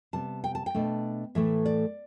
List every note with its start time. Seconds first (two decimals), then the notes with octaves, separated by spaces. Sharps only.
0.13 C3 G3 B3 A5
0.44 G5
0.55 A5
0.66 G5
0.75 B2 A3 D4
1.35 A2 E3 A3 E5
1.66 D5